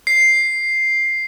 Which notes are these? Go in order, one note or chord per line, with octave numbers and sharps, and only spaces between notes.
C7